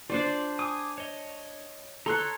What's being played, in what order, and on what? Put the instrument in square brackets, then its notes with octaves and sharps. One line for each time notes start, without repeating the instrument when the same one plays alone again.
[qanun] D4 C5 D5 [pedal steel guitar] F4
[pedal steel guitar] G#5 D6 D#6
C#5 D#5
[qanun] A4 C#5 [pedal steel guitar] A#5 C6 F#6